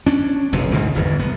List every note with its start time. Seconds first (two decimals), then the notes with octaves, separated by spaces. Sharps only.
0.07 C#4 D4
0.53 F#1 B1 F2 C3
0.71 D2 G#2 B2 E3
0.95 G1 E2 G#2
1.19 C2 B3